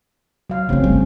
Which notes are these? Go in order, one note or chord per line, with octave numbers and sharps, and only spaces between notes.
F#3 F5
C#3 A3 C4 C#4 D#4
G1 G3